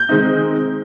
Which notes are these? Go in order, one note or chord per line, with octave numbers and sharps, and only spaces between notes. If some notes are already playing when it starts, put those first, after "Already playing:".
Already playing: G6
D#3 G#3 C4 D#4